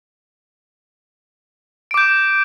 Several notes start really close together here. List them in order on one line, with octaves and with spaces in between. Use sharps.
D7 D6 G6